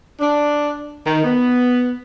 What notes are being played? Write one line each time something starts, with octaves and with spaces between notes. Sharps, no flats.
D4
D#3
B3